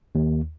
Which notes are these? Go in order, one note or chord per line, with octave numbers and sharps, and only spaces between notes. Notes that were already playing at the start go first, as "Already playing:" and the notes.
D#2